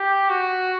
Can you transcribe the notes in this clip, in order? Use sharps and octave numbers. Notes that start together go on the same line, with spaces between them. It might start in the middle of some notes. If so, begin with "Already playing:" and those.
Already playing: G4
F#4